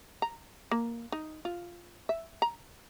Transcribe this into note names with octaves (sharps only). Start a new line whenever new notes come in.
A#5
A#3
D#4
F4
E5
A#5